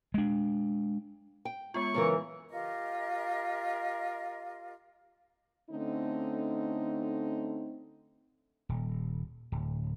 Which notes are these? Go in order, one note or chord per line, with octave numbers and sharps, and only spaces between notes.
G#3 D4
G5
G#3 B3 F4 C#6
F#2 C#3 E3 A#4
F4 G4 A#4 D#5
D3 A3 C4 C#4 D#4
D#1
D1